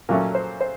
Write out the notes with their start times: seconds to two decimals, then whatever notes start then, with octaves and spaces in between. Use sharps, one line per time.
0.09 A#2 F#3 A3 C#4 A#4
0.35 C5
0.61 C5